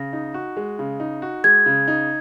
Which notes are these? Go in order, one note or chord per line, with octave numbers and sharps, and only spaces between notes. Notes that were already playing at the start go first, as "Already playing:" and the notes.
Already playing: C#3 A#6
D#4
F#4
G#3
C#3
D#4
F#4
G#3 G#6
C#3
D#4